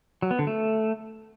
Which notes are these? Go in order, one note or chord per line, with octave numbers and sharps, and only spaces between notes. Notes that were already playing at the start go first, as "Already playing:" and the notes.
F#3
B3
D3
A3